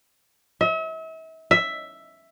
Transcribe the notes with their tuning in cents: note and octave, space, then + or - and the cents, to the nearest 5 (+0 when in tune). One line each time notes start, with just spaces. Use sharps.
E5 -40
E5 +5